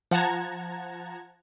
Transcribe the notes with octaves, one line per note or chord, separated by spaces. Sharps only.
F3 F#5 A5 A#5 G#6